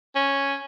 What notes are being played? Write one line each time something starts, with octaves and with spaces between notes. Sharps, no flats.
C#4